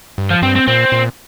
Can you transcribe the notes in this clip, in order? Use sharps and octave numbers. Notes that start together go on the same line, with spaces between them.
G2
F3
G2 C4
C4
A#2 C4
A#2